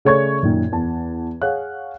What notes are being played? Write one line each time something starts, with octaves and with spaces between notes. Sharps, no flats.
C#3 A3 C#5 D5 C#6 G#6
F#2 A#2 D#3
E2 A5
G#4 C#5 F5 F#5 F#6